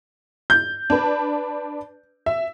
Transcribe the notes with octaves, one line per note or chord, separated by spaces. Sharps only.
G6
D4 B4
E5